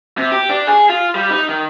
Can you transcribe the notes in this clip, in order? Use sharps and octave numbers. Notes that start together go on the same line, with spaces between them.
C3
G4
D4
G#4
F4
G3
D#4
D#3